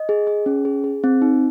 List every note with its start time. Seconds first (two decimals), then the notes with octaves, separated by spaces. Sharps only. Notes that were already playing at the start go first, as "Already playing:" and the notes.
Already playing: D#5
0.09 G#4
0.27 G#4
0.46 C#4
0.65 G#4
0.84 G#4
1.04 C4
1.22 D#4